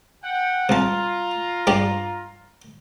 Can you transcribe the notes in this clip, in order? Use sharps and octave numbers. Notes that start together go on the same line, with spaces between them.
F#5 G5
C2 F4 A5 A#5
G2 G4 D5